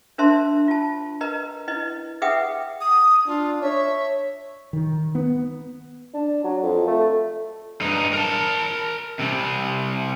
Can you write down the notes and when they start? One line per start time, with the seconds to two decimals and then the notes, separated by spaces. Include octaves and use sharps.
0.18 D4 A#4 C5 E5 A5 C6
0.68 F4 A5
1.21 A#4 B4 D#5 A#5
1.68 E4 B4 D#5
2.22 G#4 B4 E5 F#5 G5 D#6
2.81 D#6
3.27 D4 F4
3.62 C#5 E5
4.73 D#3
5.15 B3
6.14 D4
6.44 F#3
6.63 F2
6.87 A3
7.81 G2 D#4
8.13 A#4 A5
9.19 C3 G3